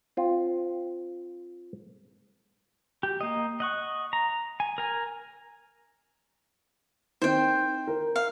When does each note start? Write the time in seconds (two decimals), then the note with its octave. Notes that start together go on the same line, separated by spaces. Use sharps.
0.17 C4 F4
3.03 G4
3.21 A#3 D#5
3.60 D#5 F#5 C#6
4.13 A#5
4.60 G#5
4.78 A#4 G#5
7.22 D#3 C4 C5 G5
7.87 A#4
8.16 F5